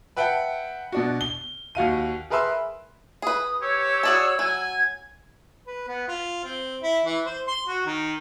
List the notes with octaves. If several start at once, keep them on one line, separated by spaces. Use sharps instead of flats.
B4 E5 F#5 G5 A5
B2 D4 F#4
G7
D#2 F#4 F5 D#7
G#4 A#4 B4 E5 C6 E6
G#4 B4 D#6
G4 C#5 E6
F#4 G#4 D5 A5
F#3 G#5 G#6
B4
B3
F4
C4
E4
E3
C5
C6
F#4
D#3